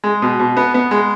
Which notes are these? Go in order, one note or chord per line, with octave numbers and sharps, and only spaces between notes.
G#3
B2
B2
B3
B3
G#3